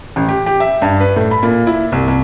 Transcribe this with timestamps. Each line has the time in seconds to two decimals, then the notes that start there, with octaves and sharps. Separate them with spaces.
0.16 A1
0.29 G4
0.46 G4
0.60 E5
0.82 G2
1.01 B4
1.16 A2
1.31 B5
1.43 A#2
1.67 E4
1.92 C2
2.08 C2